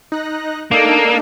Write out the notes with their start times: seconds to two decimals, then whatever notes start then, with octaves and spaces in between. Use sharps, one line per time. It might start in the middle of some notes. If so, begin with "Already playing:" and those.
0.12 D#4 F#6 A#6
0.71 A#3 D4 D#4 A4